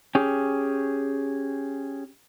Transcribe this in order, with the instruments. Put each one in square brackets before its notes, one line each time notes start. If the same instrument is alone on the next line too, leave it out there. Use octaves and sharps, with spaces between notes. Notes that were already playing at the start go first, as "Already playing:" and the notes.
[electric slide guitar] C#4 G4 G#4